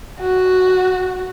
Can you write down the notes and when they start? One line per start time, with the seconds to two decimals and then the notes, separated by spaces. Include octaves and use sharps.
0.20 F#4